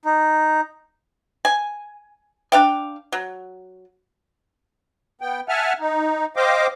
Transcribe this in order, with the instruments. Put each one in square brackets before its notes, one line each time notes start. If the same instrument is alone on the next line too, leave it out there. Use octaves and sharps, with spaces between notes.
[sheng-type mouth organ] D#4
[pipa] G#5
D4 F5 G5
F#3
[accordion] B3 G5
E5 F#5 G#5 A5 F6
D#4
C5 D#5 F5 G5 D6